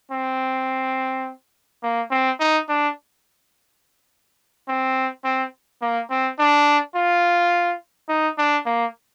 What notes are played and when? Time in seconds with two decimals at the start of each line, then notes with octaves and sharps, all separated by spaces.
0.12 C4
1.83 A#3
2.11 C4
2.40 D#4
2.69 D4
4.68 C4
5.24 C4
5.82 A#3
6.10 C4
6.39 D4
6.95 F4
8.09 D#4
8.38 D4
8.66 A#3